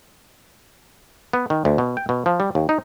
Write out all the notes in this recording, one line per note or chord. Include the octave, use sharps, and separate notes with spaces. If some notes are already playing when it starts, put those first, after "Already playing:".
B3
D#3
D2
B2
G5
B2
F3
G3
D#2
D#4